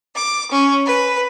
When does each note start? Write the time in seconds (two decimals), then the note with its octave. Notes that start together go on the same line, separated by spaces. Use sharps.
0.14 D6
0.51 C#4
0.86 B4